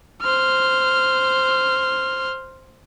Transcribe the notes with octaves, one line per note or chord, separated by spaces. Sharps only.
C5 F6